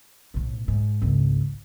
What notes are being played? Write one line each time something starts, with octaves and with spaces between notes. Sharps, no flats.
B1 A2
G#2
G#1 C#2